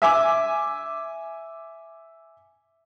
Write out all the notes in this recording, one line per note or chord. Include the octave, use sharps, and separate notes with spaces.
E5 G#5 D6